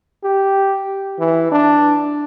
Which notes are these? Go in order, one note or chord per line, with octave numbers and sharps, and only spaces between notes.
G4
E3
D4